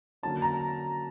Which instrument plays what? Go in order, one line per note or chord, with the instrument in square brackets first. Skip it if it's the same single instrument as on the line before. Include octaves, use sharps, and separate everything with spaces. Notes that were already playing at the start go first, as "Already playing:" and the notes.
[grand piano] D3 F#3 A#3 C#4 A5
A#5